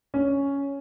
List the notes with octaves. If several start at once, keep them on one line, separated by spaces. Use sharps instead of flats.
C#4